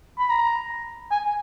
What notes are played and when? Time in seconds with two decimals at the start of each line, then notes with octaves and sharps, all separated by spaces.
0.18 B5
0.30 A#5
1.11 G#5